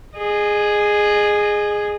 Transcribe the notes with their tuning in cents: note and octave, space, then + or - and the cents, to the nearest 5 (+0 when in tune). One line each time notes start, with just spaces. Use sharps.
G#4 +0 D#5 -30